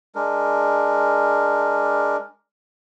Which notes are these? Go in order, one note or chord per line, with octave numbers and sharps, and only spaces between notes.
G#3 D4 A#4